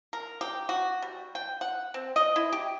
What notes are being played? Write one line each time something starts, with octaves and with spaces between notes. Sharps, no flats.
A#4
G4
F#4
G3
G5
F#5
C4
D#5
E4
G4